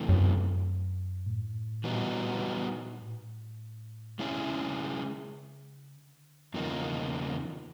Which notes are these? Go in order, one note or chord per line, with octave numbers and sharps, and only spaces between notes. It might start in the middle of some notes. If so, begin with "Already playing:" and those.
Already playing: E2 C3 E3 A3
F#2
A2
A#2 E3 G3 B3 D#4 F#4
A2
B2 G#3 C#4 E4 G#4
C3
D3
C#3
D3
E2 C#3 F3 A#3 D#4